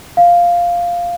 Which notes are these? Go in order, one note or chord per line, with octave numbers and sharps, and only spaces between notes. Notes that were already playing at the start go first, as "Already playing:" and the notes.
F5